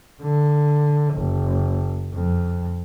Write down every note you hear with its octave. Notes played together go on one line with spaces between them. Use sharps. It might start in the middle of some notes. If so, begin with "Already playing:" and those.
D3
F#1
F2